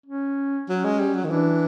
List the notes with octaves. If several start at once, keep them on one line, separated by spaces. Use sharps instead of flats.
C#4
F#3 C#4
G#3
G3
F#3
D#3
E3 D4